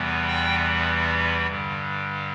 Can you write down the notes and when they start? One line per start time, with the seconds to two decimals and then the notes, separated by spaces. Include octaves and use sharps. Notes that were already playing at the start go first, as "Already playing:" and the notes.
Already playing: E2 C3 E3 G3 B3
0.27 G5
1.46 G2 D3 G3